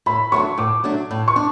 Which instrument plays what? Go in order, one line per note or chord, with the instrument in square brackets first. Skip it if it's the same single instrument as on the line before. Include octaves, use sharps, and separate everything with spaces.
[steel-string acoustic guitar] A2 [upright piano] B5
[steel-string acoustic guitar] F#3 A3 D4 [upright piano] C#6
[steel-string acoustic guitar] A2 [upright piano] D6
[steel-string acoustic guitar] F#3 A3 D4
A2
[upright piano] C#6
[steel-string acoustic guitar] D4